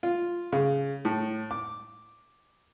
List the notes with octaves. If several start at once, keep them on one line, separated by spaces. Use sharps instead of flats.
F4
C#3
A2
D6